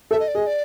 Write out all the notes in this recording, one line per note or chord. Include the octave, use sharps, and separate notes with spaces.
A4 E5
D#5
D5
G#4 D#5
D5